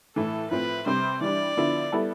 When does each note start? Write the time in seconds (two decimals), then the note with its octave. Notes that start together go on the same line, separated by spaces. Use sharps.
0.15 A2 E3 A3 A4
0.51 A2 F3 C4 B4
0.86 C3 G3 C4 C5
1.21 E3 G3 D4 D5
1.57 D3 F3 B3 E4
1.92 G3 B3 E4 A4